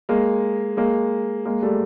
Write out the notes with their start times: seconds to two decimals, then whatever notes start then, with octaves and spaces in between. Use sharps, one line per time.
0.09 G#3 A#3
0.77 G#3 A#3
1.45 G#3 A#3
1.63 G3 A3